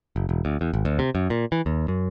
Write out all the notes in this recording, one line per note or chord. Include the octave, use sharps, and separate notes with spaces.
F#1
E1
D2
E2
G#1
D2
C3
F#2
A#2
E3
D#2
F#2